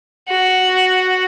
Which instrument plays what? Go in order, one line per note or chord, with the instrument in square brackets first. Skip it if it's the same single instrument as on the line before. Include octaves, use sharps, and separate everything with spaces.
[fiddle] F#4